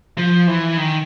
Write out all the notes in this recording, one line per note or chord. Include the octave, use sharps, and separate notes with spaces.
F3
E3
D#3